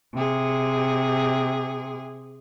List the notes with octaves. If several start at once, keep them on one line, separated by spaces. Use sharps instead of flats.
C3 G#4